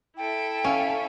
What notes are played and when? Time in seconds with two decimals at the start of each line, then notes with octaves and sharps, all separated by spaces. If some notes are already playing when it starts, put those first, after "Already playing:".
0.17 E4 A4 E5 G5
0.64 C#4 F5 G#5